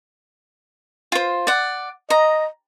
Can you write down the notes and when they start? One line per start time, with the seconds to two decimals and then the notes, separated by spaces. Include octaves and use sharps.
1.12 F4 C5
1.47 D5 F#5
2.10 D#5 A#5